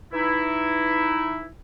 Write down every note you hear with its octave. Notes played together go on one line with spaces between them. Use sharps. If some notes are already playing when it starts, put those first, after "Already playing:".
E3 D#4 E4